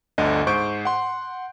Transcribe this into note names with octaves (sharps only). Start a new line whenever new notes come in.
G1 D2 D3 D#5
G#2 C5 C#6 G6 D7
F#5 C6